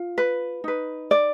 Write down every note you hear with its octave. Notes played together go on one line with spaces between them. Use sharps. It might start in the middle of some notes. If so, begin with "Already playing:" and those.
Already playing: F4
B4
D#4 B4
D5